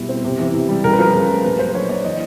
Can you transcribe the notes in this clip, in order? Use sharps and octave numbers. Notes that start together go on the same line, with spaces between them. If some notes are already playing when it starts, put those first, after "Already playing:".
Already playing: B2 G3 E4
C4
C3
E3
C3
G3
C#3 A#4
B4
F3 A#4
C#3
A3
A#2 B4
F#3 C5
D4 C#5
A#3 D5
E3 D#5